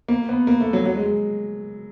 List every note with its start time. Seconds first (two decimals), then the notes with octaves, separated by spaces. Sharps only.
0.08 A#3
0.29 B3
0.47 A#3
0.60 A3
0.73 F#3
0.86 F#3
0.96 G#3
1.06 G#3